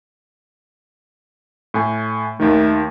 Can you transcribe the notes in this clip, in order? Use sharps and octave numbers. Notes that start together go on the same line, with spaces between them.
A2 G#5
D#2 D#3 A3